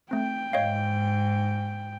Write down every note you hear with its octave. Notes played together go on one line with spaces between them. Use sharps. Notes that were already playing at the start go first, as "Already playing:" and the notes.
A3 C4 G5
G#2 C#5 D#5 F5